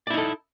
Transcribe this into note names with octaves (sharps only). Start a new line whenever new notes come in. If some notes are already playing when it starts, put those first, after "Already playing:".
D#4 E4 A4 D5